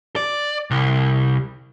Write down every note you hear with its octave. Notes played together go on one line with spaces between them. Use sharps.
D5
C2